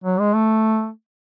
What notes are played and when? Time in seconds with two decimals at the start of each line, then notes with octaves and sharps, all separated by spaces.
0.04 F#3
0.19 G#3
0.35 A3